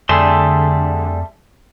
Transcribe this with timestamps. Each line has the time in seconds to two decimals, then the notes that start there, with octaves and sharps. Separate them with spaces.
0.09 F2 D3 G3 A3 G#4 E5 A5 C6